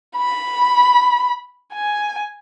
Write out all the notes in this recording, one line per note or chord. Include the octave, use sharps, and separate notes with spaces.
B5
G#5